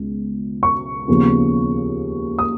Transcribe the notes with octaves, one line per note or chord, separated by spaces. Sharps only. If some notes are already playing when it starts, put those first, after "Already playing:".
Already playing: C#2 B2 G#3 B3
C#6
D#2 C#3 F3 B3
D#6